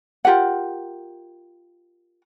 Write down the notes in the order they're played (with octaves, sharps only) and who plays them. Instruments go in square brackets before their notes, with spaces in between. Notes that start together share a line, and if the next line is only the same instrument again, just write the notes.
[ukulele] F4 G4 A#4 F#5